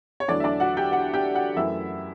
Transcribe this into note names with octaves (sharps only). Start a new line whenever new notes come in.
C#5
E2 D3 F#3 A3 D4 E4 D5
E5
D4 D5
F#4 F#5
G4 G5
F#4 F#5
G4 G5
F#4 F#5
F#2 E3 A3 E4 E5